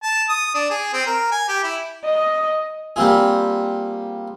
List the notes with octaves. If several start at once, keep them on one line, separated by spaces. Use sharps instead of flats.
A5
D#6
D4
G#4
C4
A#4
G#5
G4
E4
D#5
G3 A#3 C4 F4 G#4